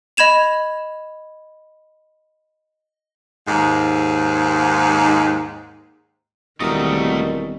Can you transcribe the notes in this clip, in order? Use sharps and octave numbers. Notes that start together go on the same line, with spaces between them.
D#5 B5 G#6 E7 F7
D#2 G#2
E1 D#3 G3 A3 C4 F#4 A#4 D#5